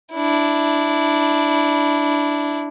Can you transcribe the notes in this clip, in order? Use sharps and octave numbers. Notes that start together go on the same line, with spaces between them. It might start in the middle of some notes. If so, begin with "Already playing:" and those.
D4 E4